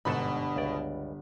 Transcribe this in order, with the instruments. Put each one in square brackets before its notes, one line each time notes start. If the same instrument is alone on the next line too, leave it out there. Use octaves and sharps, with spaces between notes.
[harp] G1 B3 E7 [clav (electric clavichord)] G#2 A4 [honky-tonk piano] B2 B5
[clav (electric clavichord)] C#2 D5